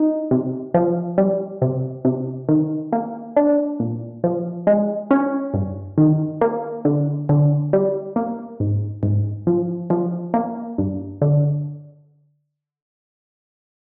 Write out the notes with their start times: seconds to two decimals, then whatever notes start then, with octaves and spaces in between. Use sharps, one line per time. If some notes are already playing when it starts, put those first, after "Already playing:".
Already playing: D#4
0.31 C3
0.74 F3
1.18 G3
1.62 C3
2.05 C3
2.49 D#3
2.93 A#3
3.36 D4
3.80 A#2
4.24 F3
4.67 G#3
5.11 C#4
5.54 G2
5.98 D#3
6.41 A#3
6.85 D3
7.29 D3
7.73 G3
8.16 A#3
8.60 G#2
9.03 G#2
9.47 F3
9.90 F3
10.34 A#3
10.78 G2
11.22 D3